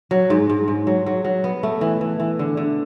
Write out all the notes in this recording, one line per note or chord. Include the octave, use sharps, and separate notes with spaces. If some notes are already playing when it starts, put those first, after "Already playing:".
F#3
G#2
G#2
G#2
F#3
F#3
F#3
B3
A3
E3
E3
E3
D3
D3